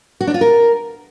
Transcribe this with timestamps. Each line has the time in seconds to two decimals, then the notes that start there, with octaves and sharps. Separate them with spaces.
0.21 F#4
0.27 D4
0.34 F4
0.41 A#4